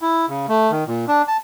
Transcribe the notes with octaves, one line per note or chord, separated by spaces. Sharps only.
E4
C#3
A3
D#3
A#2
D4
A5